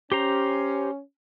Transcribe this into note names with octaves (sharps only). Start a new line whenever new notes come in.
C#4 G4 C5 A#5